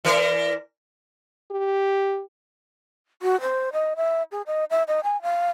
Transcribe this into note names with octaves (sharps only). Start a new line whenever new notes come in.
E3 A#4 D5
G4
F#4
C5
D#5
E5
G#4
D#5
E5
D#5
G#5
F5